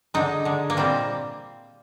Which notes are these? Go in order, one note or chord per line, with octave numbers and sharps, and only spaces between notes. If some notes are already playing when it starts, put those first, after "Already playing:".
D3 G#3 D#4
D3 G#3
A#3
A#2 G3 C4